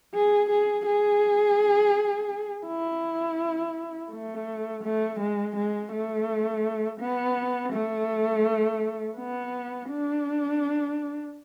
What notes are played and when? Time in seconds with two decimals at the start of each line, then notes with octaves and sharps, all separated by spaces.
0.14 G#4
0.50 G#4
0.86 G#4
2.67 E4
4.11 A3
4.84 A3
5.20 G#3
5.56 G#3
5.92 A3
7.00 B3
7.73 A3
9.17 B3
9.89 D4